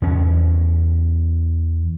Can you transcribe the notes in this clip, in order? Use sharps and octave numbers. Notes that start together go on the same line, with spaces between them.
E2 C#4